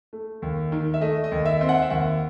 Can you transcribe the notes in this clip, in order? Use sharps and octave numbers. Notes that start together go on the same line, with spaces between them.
A3
D#2
D#3
E5
A3 D#5
D#5
D#2
E5
C4
F#5
E5
D#2 F#5